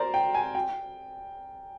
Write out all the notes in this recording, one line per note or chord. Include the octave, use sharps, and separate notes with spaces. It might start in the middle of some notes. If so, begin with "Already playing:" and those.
Already playing: A#4 C5 D5
G5
G#5
G5